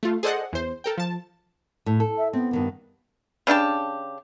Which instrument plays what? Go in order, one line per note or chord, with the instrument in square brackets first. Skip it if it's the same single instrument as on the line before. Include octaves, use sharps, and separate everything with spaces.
[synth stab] A3 F4
G#4 A4 C5 D5 D#5 F#5
E2 C5
A4 A#4 G5
F3 A5
[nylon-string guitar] A2
A4
[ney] E5
[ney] B3 [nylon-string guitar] C4
[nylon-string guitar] G2 D#3 A#3
[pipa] C#3 D4 G4 A5